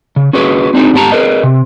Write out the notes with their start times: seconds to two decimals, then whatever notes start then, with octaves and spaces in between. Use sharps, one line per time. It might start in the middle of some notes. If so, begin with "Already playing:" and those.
0.16 C#3
0.33 C#4 F#4 G#4 B4
0.74 C4 D4 D#4 F#4 G#4
0.94 G#2 B3 G4 A4 A5 A#5
1.12 G#4 A#4 B4 D#5
1.43 C3